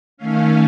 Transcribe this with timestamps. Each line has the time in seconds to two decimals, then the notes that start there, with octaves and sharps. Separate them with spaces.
0.17 D#3 A3 C#4 F5